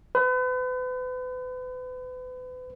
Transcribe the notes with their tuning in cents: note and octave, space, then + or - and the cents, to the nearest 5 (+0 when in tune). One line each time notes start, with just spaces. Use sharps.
B4 +40